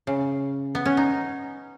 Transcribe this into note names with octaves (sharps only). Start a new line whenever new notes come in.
C#3
B3
C#4
D#4